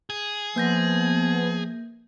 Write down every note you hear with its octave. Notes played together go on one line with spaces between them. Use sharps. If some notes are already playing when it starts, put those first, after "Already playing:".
G#4
F3 A#3 B3 G6 A#6